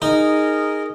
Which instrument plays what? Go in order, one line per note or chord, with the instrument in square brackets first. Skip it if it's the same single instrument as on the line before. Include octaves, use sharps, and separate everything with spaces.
[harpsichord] D#4 [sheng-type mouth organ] G#4 A#4 D#5